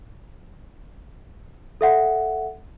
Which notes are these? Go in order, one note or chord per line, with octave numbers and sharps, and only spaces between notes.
A4 E5 F#5